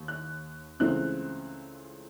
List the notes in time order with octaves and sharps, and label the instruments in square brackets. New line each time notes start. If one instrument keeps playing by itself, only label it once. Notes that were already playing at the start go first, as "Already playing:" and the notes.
Already playing: [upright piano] D#2
F#6
C#2 C#3 E3 A3 C4 F#6